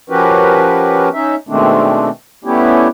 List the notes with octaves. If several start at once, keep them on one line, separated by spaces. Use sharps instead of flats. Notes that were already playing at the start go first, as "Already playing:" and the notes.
F3 C#4 F#4 G4 A#4 B4
C#4 D#4 E5
B2 D#3 G#3 A3 C4 D4
G3 A3 B3 C#4 E4 G4